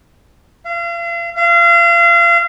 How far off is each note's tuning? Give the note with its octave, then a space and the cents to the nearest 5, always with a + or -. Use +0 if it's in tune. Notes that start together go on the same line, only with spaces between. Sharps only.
F5 -40
F5 -35